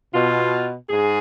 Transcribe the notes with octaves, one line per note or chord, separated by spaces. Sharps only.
B2 F4
G#2 G#4